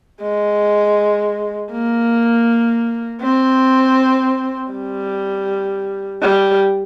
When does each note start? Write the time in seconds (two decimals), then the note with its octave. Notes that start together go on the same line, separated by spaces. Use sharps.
0.22 G#3
1.72 A#3
3.22 C4
4.73 G3
6.22 G3